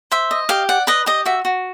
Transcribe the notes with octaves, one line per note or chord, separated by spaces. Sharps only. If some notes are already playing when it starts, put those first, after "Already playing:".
C5 E5
D#5
G4 F5
D5 F#5
B4 D#5
G4 D#5
F#4 E5
F#4